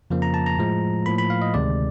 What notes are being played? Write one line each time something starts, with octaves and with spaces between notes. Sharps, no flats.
F2 C#3 F3 A#3
A#5
A5
A#5
A2 F3 G#3
A2 F3 A#3 B5
B5
F5
D#5
D2 C3 D#3 G#3 D5